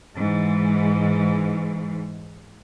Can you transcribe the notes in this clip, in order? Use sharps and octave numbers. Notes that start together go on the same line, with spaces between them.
G#2 E3